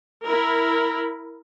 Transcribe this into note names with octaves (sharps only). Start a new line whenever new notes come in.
E4 A#4